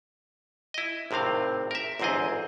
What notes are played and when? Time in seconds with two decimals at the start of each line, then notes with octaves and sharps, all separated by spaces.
0.74 E4 D#5
1.11 G#1 A2 C3 C4 F5
1.71 A#4 E5
2.00 G1 E2 G#2 C4 G#4 D#5